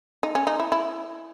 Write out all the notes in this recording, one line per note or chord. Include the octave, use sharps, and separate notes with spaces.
D#4
C#4
D#4
E4
E4